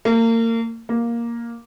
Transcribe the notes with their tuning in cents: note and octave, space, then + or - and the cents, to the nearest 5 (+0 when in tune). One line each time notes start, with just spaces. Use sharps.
A#3 -35
A#3 +5